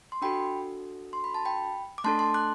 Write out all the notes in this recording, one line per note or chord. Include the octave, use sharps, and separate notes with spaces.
C6
D4 F#4 A4 G5 B5
C6
B5
A5
G5 B5
D6
A3 D4 A4 A5 C6
A5 C6
D6 F#6